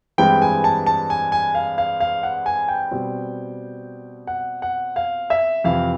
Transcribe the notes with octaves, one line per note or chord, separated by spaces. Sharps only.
G2 E3 G#3 C4 G5
G#5
A5
A5
G#5
G#5
F5
F5
F5
F#5
G#5
G5
B2 G3 C4
F#5
F#5
F5
E5
F2 C3 E3 F5